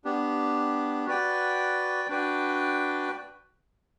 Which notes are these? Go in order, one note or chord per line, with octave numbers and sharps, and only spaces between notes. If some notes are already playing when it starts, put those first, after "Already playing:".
B3 D4 G4
F#4 B4 D5 G5
D4 F#4 B4 D5 G5